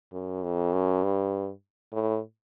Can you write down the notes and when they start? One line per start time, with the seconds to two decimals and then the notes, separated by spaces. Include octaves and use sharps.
0.13 F#2
0.43 F2
0.73 F#2
1.03 G2
1.93 A2